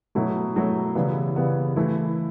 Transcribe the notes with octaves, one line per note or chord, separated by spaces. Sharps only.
B2 F#3 A3 E4
B2 F#3 A3 E4
C#3 E3 G3 B3
C#3 E3 G3 B3
E3 A3 E4